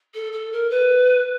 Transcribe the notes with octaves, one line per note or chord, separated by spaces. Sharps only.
A4
A4
A#4
B4